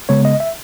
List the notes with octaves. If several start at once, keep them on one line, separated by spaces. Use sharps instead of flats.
C#3 G#3 B3 C#5
D#5
E5